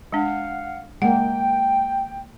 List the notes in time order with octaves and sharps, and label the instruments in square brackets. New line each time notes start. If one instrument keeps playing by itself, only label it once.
[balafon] G#3 D4 [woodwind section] F5 F#5
[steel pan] G#3 A#3 [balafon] F#5 [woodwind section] G5